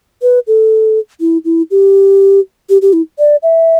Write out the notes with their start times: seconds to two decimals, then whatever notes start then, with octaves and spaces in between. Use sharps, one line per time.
0.22 B4
0.47 A4
1.20 E4
1.45 E4
1.71 G4
2.69 G4
2.82 G4
2.93 E4
3.19 D5
3.43 E5